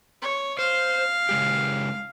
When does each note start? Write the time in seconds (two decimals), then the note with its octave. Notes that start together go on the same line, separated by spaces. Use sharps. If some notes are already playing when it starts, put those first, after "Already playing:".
0.22 C#5
0.59 C5 F5
1.29 C#3 G#3 G4